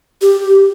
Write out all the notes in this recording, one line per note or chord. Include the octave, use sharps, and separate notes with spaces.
G4